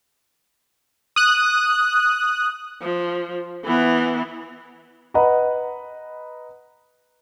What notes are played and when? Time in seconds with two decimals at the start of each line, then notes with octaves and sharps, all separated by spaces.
1.16 D#6 F#6
2.82 F3
3.64 E3 B3
5.14 B4 D#5 F#5 A#5 B5